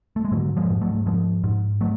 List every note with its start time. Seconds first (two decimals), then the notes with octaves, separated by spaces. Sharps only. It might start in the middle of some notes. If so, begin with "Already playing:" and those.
0.16 A3
0.25 G#3
0.32 G#2 D3 F#3
0.57 F3 G#3
0.70 G#2
0.81 F#3 A3
1.06 G#2 F3 G#3
1.44 G#2
1.81 F#3 A3